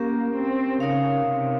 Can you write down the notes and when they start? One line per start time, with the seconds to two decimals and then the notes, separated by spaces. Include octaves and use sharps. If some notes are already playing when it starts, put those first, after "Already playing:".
Already playing: A#3 C#4 G4 A#4
0.35 C4
0.80 C#3 D#4 A#4 C#5 F5
1.24 C3